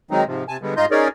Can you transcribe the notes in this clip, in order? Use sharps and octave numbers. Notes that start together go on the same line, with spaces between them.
D#3 F#3 G#3 C4 D#4
G#2 C3 F3
C3 G#5 A5
D3 G3 G#3 B3
G#2 D#4 F4 D#5 C6 G6
C#4 D#4 G#4 A#4 C#5 D5